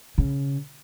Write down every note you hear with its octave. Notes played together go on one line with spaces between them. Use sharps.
C#3